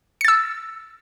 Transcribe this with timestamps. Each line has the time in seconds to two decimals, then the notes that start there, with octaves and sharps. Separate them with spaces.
0.21 C#7
0.25 A6
0.28 E6